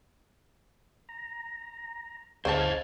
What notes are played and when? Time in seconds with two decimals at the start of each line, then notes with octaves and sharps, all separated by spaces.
1.09 A#5
2.45 D2 C#3 C#4 C5 D#5 F5 A5 G#6